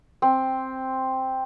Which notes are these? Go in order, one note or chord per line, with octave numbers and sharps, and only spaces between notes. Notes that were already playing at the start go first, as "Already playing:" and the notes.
C4